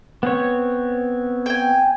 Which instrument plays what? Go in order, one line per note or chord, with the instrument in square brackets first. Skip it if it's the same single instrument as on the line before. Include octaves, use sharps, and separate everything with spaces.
[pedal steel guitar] B3 C4 C#5
[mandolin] G5 G#5